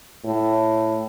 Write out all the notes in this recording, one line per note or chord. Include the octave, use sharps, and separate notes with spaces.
A2